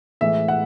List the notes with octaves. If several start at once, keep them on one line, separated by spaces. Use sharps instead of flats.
A2 E3 G#3 E5
F#5